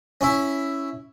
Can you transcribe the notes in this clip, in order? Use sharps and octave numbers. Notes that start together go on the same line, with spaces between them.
C#4 E4